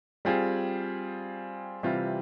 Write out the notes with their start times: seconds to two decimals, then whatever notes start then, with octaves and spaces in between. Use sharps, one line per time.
0.25 G3 C4 F4 G#4
1.83 C3 E3 G3 C4 F4